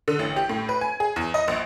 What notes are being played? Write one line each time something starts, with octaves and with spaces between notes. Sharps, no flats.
D3
A1
G4
A2
B4
G#5
G#4
E2
D#5
A#1